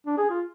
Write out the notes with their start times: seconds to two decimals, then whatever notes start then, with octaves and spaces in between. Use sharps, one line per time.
0.06 D4
0.18 G#4
0.30 F4